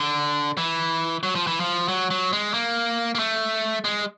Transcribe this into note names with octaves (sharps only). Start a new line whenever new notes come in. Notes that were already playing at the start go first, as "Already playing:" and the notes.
Already playing: D3
E3
F#3
F3
E3
F3
F#3
F#3
G#3
A#3
A#3
A3
G#3